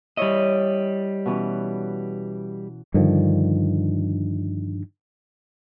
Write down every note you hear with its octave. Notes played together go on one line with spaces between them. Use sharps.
G3 E4 C#5 D#5 E5
B2 E3 C#4
G2 D3 D#3 F3